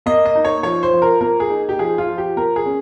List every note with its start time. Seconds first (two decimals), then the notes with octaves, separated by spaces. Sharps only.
0.06 A#3 D#5
0.26 D#5
0.35 D#4
0.45 C#5
0.63 F3 C#5
0.83 C5
0.93 F3
1.02 A#4
1.21 A#3 A#4
1.40 G#4
1.50 D#4
1.69 G4
1.79 F3 G#4
1.98 F4
2.08 F3
2.18 G4
2.36 A#3 A#4
2.56 G#4
2.66 C#4